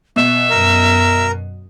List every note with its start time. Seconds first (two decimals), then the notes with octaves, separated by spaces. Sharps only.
0.16 B2 E5
0.50 F#2 A#4